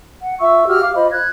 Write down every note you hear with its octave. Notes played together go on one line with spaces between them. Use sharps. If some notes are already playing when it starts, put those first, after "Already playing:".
F#5
F4 E5 C#6 E6
F#4 G4 E6 F6
F5 D6
F4 C5 D#5 B5
F#6 G#6